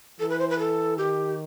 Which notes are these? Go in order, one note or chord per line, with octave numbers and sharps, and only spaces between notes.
E3 A4
B4
C5
B4
A4
D#3 G4